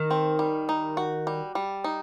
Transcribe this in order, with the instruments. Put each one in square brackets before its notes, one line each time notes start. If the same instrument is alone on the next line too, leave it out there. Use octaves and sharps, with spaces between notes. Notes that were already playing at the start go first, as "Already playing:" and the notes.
Already playing: [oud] D#3
[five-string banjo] C4
G3
D#4
F#4
G3
G3
D#4